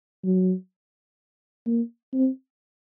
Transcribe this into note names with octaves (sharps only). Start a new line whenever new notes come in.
F#3
A#3
C4